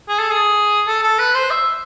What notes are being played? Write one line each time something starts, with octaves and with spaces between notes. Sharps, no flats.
G#4
A4
G#4
A4
A4
B4
C5
E5